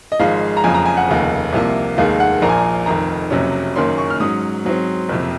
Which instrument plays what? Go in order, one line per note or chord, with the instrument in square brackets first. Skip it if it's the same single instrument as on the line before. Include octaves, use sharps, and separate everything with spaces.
[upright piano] D#5
G#1 G#2 F3 G#3 F5
A#5
F#1 F2 C#3 G#5
A#5
G#5
F#5
F1 D#2 C#3
C2 C3 F3 A#3
F1 D#2 D#3 G#3 F5
F#5
A#1 A#2 F3 A#3 A#5
G#5
A#5
F1 F2 D#3 A#5
F#1 F2 C3 F#3 C#4
F#1 F#2 D#3 A#3 C#4 C6
C#6
F6
G#2 F#3 C#4 D#6
G#2 F#3 C4
F#1 F2 C3